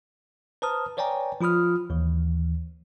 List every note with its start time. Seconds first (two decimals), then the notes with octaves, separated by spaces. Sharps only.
0.62 B4 C5 A5 A#5 D#6 F6
0.97 B4 C#5 D5 G5 G#5 A#5
1.41 F3 F4 B5 D#6 F6
1.90 D#2 E3